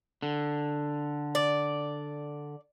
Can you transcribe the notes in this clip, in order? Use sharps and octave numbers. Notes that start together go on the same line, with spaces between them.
D3
D5